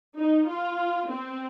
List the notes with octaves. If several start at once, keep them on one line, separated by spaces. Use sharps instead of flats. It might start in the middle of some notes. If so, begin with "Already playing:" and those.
D#4
F4
C4